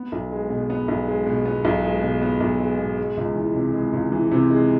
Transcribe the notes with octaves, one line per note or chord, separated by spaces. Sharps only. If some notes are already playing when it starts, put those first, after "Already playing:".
Already playing: B3
B1
G#3
B2
B3
B1
G#3
B2
B3
B1
G#3
B2
B3
B1
G#3
B2
G#3
C#2
E3
C3
G#3
C#2
E3
C3
G#3